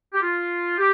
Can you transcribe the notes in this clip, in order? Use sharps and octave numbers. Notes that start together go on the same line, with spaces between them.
G4
F4
G4